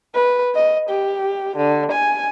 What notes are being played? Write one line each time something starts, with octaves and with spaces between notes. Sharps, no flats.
B4
D#5
G4
D3
G#5